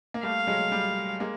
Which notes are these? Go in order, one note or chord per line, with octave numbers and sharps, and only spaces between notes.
A#3
G3 A3 F5
F#3 G#3
G3
G#3 A#3